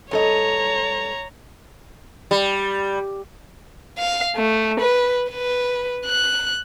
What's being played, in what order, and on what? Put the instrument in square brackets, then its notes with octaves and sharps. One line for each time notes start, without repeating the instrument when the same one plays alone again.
[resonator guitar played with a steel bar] G2 A4 D#5 [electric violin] C#5 A#5
[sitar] G3
[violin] F5
A3
B4
B4
F#6